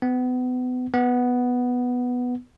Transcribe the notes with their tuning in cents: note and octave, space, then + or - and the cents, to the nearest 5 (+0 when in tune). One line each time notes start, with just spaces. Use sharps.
B3 +30
B3 +0